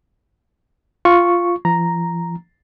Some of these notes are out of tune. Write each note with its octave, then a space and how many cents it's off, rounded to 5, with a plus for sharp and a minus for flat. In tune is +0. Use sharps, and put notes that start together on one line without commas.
F4 +0 C#6 +0
F3 -40 A#5 +0